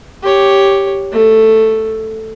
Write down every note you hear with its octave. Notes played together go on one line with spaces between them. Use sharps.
G4 C#5
A3